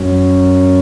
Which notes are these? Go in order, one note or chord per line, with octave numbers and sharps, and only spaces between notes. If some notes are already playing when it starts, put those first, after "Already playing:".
Already playing: F#2 F#3 C#4